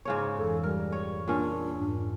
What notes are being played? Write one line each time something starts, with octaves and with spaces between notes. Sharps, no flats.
G#2 C#3 C#5
F2 E3 A4
G3 A#4
C#5
A#2 C#4 D4
F2 G#2